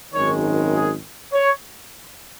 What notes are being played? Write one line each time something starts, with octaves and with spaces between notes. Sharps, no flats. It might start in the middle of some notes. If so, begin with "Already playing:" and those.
G#1 F#2 D#3 G#3 C#5
G#4
C#5